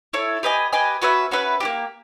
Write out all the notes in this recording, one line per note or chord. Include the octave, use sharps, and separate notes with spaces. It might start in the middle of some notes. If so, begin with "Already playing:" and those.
E4 A4 C#5
G4 B4 D#5 G#5
G4 B4 D#5 G#5
C#4 F#4 B4 E5
C#4 F#4 B4 E5
A#3 D4 G4